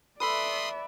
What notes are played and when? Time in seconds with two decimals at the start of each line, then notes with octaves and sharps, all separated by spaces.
0.20 A4 B4 D5 E5 B5 C6 D#6